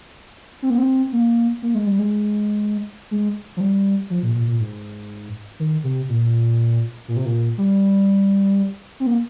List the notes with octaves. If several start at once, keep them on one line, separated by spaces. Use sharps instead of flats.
C4
A#3
C4
A#3
A#3
G#3
G3
G#3
G#3
F3
G3
F3
A#2
A#2
A#2
G#2
D#3
C3
A#2
A#2
C3
A#2
G3
C4
A#3